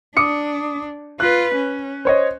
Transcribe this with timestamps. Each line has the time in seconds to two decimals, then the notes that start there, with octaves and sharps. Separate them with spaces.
0.17 D4 D6 D#6 C#7
1.20 F4 B4 F#6
1.55 C#4
2.05 C5 C#5 D#5